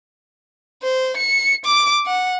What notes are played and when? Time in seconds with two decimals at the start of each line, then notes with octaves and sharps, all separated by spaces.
0.83 C5
1.17 C#7
1.65 D6
2.06 F#5